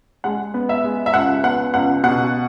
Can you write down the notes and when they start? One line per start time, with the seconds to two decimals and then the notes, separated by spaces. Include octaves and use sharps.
0.24 G#3 F#5
0.54 B3
0.69 E5
0.84 G#3
1.06 E5
1.14 C#2 F#5
1.44 B3 F#5
1.74 C#2 F#5
2.03 B2 F#5